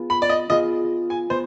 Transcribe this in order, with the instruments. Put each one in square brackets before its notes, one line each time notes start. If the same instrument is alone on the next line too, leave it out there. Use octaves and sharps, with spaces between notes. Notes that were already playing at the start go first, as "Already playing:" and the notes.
Already playing: [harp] B3 F4 G#4
[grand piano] B5
D5
D#5
[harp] B3 F4 G#4 [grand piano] D#5
[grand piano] G#5
[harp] B3 [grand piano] C5